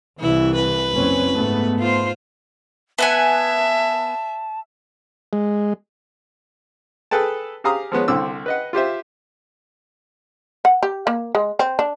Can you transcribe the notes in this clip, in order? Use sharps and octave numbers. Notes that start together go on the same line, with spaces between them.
C2 E3 E4
B4
F#1 C4 C#4
G#2 A3 B3
F4 C5
B3 E5 F#5 G#5 A5
G#3
G#4 A4 B4 G5 A5
G4 G#4 F5 A#5 D#6
F3 G#3 B3 C#5
C2 D3 C4 D6 E6
B4 D#5 F#5
F4 G4 C5 E5
F#5
G4
A#3
G#3
C4
D4